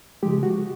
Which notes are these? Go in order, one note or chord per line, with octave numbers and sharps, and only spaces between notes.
C#3 F3 G#3 G4
F#4